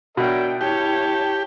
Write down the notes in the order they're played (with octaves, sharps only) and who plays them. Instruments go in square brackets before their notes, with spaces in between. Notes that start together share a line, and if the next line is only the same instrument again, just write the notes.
[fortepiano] B2 [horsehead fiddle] D4 G5 [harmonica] A#4 C#5 E5
[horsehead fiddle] E4 C#5 [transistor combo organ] G4 [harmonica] A5